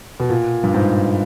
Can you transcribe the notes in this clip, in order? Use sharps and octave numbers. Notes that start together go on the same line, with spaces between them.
B2
A#2
G2
G#2